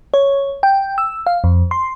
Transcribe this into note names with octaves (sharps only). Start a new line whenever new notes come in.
C#5
G5
E6
F5
F2
C6